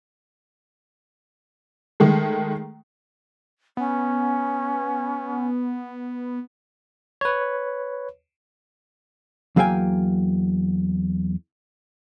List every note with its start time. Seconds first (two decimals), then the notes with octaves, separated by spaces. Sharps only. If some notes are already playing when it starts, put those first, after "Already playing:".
2.00 D#3 G#3 A3
3.77 B3 C#4
7.21 B4 C#5
9.56 E2 F#3 A#3 F5 G5 G#5